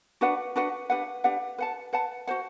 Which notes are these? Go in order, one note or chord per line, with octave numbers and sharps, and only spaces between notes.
D4 F#4 B4 F#5
D4 F#4 B4 F#5
D4 G4 B4 F#5
D4 G4 B4 F#5
B4 F#5 A5
B4 F#5 A5
F#4 C5 F#5